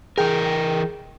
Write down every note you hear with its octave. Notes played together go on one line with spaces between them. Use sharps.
E3 G#4 A#4 G5